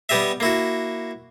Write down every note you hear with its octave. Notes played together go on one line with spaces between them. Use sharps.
G3 B3 G4 D#5 E5
A#3 E4 F#4